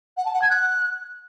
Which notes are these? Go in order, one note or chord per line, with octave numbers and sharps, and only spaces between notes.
F#5
A5
F#5
G#6
F#6